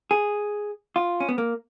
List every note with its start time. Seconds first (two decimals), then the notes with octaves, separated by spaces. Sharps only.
0.11 G#4
0.96 F4
1.20 C#4
1.29 B3
1.38 A#3